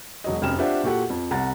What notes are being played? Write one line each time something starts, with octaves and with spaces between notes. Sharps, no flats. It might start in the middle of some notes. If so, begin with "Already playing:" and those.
E1 F#3 D#5
F1 F#2 G5 F6 E7
D4 F4 G4 C5 E5 F#5
A#2 F#4 G4 A4 F#5
F2
C2 F#5 A#5 A6